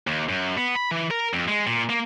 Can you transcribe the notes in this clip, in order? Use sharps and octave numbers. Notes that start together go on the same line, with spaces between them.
D#2
F#2
B3
B5
E3
A#4
F2
G#3
A#2
A#3